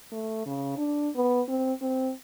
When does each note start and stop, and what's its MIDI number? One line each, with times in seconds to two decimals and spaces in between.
0.12 0.43 57
0.46 0.73 49
0.77 1.10 62
1.15 1.41 59
1.48 1.73 60
1.82 2.11 60